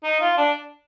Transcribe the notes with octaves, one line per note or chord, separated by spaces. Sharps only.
D#4
F4
D4